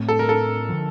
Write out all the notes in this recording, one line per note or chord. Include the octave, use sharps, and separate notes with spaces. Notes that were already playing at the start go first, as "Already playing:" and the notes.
Already playing: A2 A3 C4
A4
A#4
A4
D3 F3